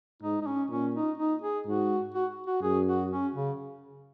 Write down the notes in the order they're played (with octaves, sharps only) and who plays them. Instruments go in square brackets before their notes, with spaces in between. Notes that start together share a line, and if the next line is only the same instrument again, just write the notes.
[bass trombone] G#2 [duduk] D#4
[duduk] D#4
C#4
[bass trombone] A#2 [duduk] C#4
[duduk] D#4
D#4
G#4
[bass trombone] G#2 [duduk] F#4
[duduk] F#4
F#4
[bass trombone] F#2 [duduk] G#4
[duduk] F#4
C#4
C#3